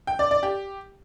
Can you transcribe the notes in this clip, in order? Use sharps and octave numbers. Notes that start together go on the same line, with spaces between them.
G5
D5
D5
G4